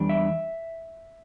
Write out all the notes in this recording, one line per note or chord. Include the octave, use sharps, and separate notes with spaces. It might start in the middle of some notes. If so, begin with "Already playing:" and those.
Already playing: E2 E3 G3 D4
E5